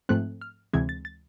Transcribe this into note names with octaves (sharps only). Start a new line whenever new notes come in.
G#2 F3 A3 C4 F#6
F6
D2 C3 E3 G#3 C4 G#6
A6
A6